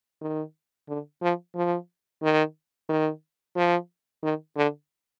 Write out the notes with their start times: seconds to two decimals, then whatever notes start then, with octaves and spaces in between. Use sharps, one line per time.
0.22 D#3
0.88 D3
1.22 F3
1.55 F3
2.23 D#3
2.89 D#3
3.56 F3
4.23 D#3
4.56 D3